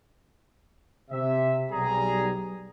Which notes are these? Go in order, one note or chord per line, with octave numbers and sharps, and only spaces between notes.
C3 E5
B1 G3 G#4 A#5